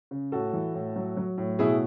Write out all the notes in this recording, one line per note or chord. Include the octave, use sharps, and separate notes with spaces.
C#3
A2 F#4 A4
E3
A2
F#3
F#3
A2
B2 E4 G#4